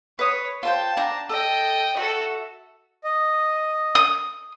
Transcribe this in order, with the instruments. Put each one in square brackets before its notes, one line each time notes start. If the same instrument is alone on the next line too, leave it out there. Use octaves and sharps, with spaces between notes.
[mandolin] B4 D#6 [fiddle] C#5
[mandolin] F4 C5 G5 [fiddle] A5
[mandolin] D4 A#5
[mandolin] A4 [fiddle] D#5 G5
[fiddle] F#4 A4 [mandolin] E5
[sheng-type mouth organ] D#5
[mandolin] D#6